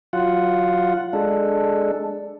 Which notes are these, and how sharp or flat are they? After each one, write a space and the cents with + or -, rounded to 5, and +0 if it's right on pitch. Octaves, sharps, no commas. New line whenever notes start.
F#3 -5 F4 +0 F#5 +0
G#3 +0 D4 +5 A4 +0